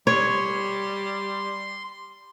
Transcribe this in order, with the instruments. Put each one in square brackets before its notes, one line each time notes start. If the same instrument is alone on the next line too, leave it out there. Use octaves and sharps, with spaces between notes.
[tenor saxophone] G3 [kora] C#5 [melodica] C6